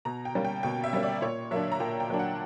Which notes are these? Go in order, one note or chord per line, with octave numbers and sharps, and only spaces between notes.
B2 A#5
G5
G3 A#3 C#4
G5
B2 G5
E5
G3 A#3 C#4
D5
A#2 C#5
F#3 A#3 D4 E5
A#5
A#2 G5
G5
F#3 A#3 D4
F#5